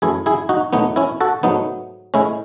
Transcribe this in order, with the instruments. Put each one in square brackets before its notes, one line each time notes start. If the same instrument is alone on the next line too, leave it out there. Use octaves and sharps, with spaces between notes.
[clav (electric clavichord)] F#2 E3 A3 E4 G#4
E4 G#4
D#4 F#4
E2 B2 F#3 A3 B3 D#4
C#4 E4
F#4 A4
G#2 F#3 A3 B3 D#4
A2 G#3 C#4 E4